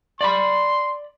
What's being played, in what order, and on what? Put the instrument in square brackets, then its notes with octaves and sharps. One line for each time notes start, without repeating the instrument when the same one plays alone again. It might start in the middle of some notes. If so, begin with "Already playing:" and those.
[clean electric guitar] D5 B5 [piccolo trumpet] C6